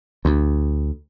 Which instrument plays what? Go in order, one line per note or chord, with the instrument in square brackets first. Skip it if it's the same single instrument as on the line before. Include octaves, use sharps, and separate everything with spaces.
[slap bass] D2